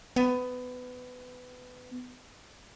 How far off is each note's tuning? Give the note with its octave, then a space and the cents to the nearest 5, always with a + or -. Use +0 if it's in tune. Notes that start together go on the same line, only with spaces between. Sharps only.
B3 +20